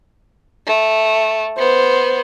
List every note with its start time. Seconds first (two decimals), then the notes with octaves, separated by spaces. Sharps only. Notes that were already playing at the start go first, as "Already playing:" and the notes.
0.67 A3
1.58 B3 C5